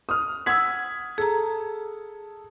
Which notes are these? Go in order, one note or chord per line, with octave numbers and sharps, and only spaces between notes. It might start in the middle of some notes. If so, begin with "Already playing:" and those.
D#6 F6
F#5 E6 G#6 B6
G#4 A4 A#5